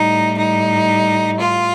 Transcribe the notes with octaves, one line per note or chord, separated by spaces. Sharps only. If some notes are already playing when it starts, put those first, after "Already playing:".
Already playing: A2 G3 D#4
D#4
F4